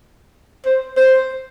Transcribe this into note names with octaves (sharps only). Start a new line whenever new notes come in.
C5
C5